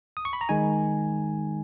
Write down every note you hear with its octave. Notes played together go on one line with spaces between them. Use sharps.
D#6
C#6
B5
A#5
D#3 G#3 D#4 G#5